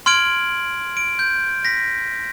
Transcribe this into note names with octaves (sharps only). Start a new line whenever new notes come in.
C6 F6 G#6 D7 F#7
D7
G6
A#6 B6